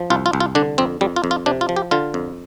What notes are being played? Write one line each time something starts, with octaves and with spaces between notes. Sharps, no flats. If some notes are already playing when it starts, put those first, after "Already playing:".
Already playing: F3
C2 F4
F4
C2
F4
D3 D4
F2 C4
F2 G3
F4
F2
F4
C3 D4
F4
F3
G4
D3 F4
F2